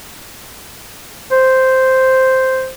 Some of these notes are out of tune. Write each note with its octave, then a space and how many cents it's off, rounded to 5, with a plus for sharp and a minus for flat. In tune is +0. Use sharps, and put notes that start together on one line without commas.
C5 -5